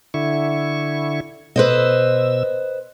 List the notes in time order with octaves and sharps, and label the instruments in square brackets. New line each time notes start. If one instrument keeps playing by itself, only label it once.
[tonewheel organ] D3 E4 C#6
[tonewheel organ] B2 E6 [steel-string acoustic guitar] B4 C5 D#5